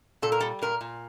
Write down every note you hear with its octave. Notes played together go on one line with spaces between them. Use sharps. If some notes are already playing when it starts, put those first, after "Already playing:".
A#2 A4
A#4
G3 A4
A#2 A#4
A#2